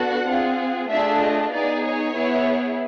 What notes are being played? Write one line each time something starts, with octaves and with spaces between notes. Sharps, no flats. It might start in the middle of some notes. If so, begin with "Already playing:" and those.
Already playing: B3 D4 F#4 A4 F#5
C4 F4 G#4
A3 D4 F4 G#4 E5
D#5
B3 D#4 G#4 D5
C#5
B3 E4 G#4